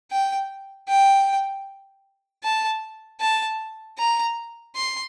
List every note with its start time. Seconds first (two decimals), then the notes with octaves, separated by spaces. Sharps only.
0.11 G5
0.88 G5
2.44 A5
3.21 A5
3.98 A#5
4.76 C6